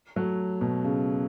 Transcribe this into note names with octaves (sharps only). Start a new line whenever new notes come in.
F#3 A3
B2
C#3